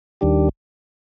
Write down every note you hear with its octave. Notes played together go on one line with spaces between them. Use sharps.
D#2 D#3 G3 D4 G4